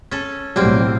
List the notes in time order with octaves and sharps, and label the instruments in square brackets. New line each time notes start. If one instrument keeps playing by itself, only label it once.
[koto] C#4 A4
[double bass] B1 A2 [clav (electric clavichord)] F#3 G3 [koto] A#3 C4